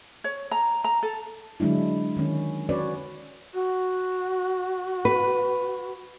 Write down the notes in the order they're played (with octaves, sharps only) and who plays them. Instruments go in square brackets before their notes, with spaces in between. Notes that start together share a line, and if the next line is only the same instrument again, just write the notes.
[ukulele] C#5
A#5
A#5
A4
[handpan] D3 F#3 G#3 D4 E4
D#3 C#4
C#4 F#4 B4 C#5 D5
[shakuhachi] F#4
[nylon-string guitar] B4